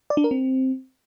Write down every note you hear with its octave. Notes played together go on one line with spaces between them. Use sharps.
D5
D4
A#4
C4